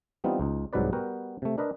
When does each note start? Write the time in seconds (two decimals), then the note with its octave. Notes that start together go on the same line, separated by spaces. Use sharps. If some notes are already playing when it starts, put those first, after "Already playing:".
0.24 E3 G3 B3 C4 D#4 F4
0.39 C#2 D#4
0.73 C2 G#2 F#3 D#4 B4 D5
0.93 G3 B3 F#4 A#4 F#5 G5
1.42 C3 A3
1.58 D4 A#4 B4 D#5